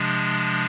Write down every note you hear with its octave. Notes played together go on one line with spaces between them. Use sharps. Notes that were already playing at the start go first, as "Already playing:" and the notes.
Already playing: C3 F3 G#3 D4